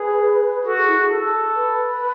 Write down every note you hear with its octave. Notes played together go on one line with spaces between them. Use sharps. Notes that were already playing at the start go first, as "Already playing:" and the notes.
Already playing: G#4 B4
F#4 A4
G#4
E4
G#4
A4
B4